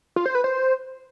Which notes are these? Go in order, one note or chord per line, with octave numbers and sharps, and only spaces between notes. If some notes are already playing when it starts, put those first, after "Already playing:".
F4
C5
B4
C5